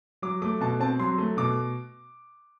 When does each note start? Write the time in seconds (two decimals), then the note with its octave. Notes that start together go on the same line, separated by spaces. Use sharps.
0.22 F#3 D6
0.42 A3 D6
0.60 B2 A5
0.80 C4 A5
0.99 F#3 C6
1.18 A3
1.37 B2 D6